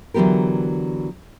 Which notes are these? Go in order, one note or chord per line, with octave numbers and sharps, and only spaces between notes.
D3 E3 F#3 B3 G4 A#4